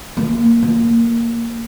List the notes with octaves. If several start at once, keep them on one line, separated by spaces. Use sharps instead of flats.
A#3
A#3